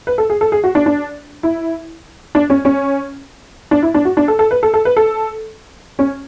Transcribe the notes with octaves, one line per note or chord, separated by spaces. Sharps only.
B4
A4
G#4
A4
G#4
F#4
D4
D4
E4
D4
C#4
C#4
D4
E4
D4
F#4
D4
A4
A4
B4
A4
A4
B4
A4
C#4